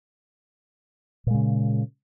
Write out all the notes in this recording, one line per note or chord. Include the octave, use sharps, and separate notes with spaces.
A#2 C#3 G#3